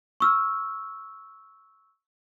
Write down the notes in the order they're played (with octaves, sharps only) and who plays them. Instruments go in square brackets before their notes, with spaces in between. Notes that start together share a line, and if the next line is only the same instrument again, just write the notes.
[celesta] C#6 E6 F6